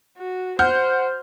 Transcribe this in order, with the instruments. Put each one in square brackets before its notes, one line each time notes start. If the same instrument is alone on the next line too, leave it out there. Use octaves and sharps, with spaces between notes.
[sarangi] F#4
[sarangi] C5 [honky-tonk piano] F#5 F6 G6